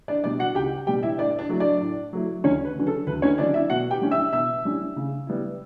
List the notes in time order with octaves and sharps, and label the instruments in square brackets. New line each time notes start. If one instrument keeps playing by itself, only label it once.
[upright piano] D4 D5
B2 G3 D4 D5
F#4 F#5
C#2 G4 G5
B2 G3 G4 G5
E4 E5
A2 D4 D5
D4 D5
F#3 A3 E4
D4 D5
A2
F#3 A3 E4
D2 C#4 C#5
B4
D3 F#3 C#4
A4
D2 B4
C#4 C#5
D3 F#3 C#4 D4 D5
E4 E5
B2 F#4 F#5
G4 G5
G3 C#4 E4
E5 E6
B2 E5 E6
G3 C#4 E4
C#3
G3 B3 E4